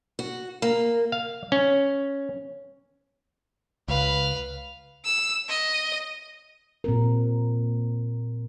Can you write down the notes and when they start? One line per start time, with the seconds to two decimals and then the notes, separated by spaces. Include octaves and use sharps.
0.19 F#4
0.62 A#3
1.12 F5
1.52 C#4
3.88 C#2 B4 F5
5.05 E6
5.49 D#5
6.84 A#2 C4 A#4